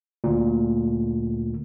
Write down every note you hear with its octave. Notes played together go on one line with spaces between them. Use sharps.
D2 A#2